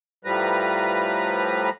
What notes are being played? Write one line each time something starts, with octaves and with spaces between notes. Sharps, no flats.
A2 F3 G3 B4 A#5